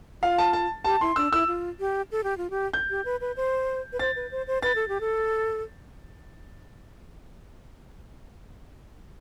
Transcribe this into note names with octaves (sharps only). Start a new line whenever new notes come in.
F4 F5
A5
A5
G4 A5
E4 C6
D4 E6
E4 E6
F4
G4
A4
G4
F4
G4
G6
G4
B4
B4
C5
B4
C5 A6
B4
C5
C5
B4 A6
A4
G4
A4